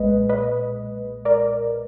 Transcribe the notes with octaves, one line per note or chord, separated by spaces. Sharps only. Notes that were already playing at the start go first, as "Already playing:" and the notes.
Already playing: B1 A#2 G#3 B4 D#5
B4 D#5
A#4 D5